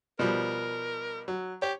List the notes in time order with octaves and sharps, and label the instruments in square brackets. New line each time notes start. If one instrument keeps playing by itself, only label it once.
[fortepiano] B2 F3 G3 [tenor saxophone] A#4
[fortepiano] F#3
[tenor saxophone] G4 [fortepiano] C#5